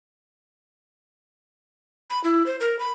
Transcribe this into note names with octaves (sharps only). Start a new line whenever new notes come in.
B5
E4
C5
A#4
B5